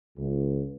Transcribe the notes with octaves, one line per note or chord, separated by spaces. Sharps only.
C#2